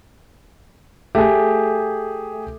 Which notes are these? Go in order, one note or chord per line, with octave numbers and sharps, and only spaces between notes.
A3 G4 G#4